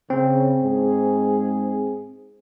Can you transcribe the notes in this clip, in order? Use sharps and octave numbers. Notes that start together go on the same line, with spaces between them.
C#3 C4
G#2 G#4